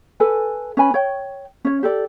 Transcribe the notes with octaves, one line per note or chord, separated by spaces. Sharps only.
A4 B4 G#5
C#4 B4 G#5 B5
C#5 G5
C#4 C#5
G4 A4 D5